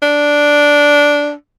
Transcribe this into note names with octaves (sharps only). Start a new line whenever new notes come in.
D4